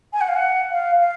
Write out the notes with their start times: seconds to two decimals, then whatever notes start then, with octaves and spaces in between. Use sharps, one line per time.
0.13 G#5
0.21 F#5
0.28 F5
0.36 F#5
0.71 F5
1.00 F5